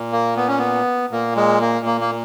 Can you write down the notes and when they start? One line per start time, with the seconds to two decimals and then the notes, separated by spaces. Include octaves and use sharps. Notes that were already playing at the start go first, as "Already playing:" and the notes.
Already playing: A#2
0.12 A#3
0.37 B3
0.48 C#4
0.58 B3
1.11 A#2 A#3
1.36 G#3
1.61 A#3
1.86 A#3
2.01 A#3